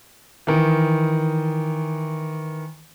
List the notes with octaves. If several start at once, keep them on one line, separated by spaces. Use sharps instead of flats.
D#3 E3